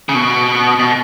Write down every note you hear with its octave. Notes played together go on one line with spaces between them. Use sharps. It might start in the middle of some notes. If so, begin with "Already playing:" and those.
C#3
B2
B2